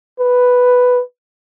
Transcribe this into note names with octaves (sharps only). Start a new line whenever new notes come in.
B4